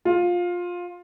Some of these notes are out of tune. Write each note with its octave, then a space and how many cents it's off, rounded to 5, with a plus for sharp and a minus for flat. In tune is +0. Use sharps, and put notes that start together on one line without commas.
F4 +15